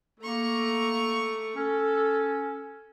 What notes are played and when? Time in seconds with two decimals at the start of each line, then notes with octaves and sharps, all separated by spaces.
0.20 A3 A#3 A#5 C#6
1.56 C#4 A4